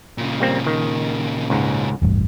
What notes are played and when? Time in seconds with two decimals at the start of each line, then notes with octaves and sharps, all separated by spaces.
0.18 A#2 C#3
0.40 G3 A#3 C4
0.67 D#3
1.50 C#2 G#2
2.02 E1 A1 G2